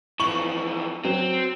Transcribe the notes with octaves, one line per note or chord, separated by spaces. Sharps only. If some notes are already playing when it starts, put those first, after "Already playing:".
F2 E3 C#6 F#7
F#3 C4